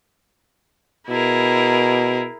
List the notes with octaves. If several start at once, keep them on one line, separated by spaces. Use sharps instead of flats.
B2 E4 G#4 A#4